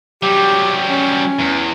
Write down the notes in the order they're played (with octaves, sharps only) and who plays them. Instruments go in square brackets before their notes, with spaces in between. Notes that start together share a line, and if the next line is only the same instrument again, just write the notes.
[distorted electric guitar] F#3 G3 [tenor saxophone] G4
[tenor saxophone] C#4
[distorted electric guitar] E2